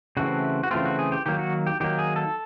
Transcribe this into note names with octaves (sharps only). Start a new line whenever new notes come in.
C#3 E3 A3 C4 F#4
F#4
C#3 E3 A3 C4 F4
F#4
G#4
G4
D#3 F#3 A#3 G4
F#4
G4
D#3 F#3 A#3 G4
G#4
A4